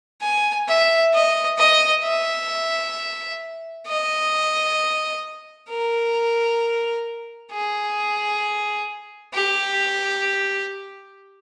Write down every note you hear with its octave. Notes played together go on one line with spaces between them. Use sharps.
G#5
E5
D#5
D#5
E5
D#5
A#4
G#4
G4